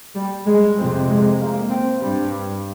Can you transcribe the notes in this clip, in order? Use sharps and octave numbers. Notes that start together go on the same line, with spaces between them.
G3
G#3
F2 C3 C4
G#3
A#3
C4
G2 G3